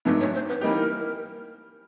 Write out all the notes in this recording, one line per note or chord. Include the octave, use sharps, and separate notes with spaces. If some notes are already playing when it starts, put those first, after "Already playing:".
G#2 D#3 F#3 A3 D4 B4
C#5
C5
B4
E3 G3 A#3 D#4 G4 A#4